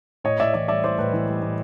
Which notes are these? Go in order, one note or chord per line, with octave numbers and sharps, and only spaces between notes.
A2 C#5 D#5
A2 D5 E5
E3 D5 E5
G3 D5 E5
A2 C5 D5
A2 B4
E3
G3
A2